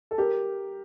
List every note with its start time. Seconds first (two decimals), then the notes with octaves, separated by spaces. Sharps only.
0.11 A4
0.18 G4 A#4